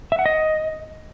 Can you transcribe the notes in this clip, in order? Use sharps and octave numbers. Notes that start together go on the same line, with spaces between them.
E5
F#5
D#5